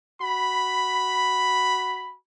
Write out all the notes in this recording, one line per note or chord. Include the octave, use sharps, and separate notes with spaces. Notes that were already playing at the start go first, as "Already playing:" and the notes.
F#4 B5